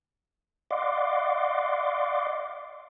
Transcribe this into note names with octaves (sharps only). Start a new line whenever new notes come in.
D5 D#5 F5 F#5 C6 D6